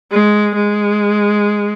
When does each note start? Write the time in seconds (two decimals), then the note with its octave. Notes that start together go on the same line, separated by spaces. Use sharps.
0.11 G#3
0.56 G#3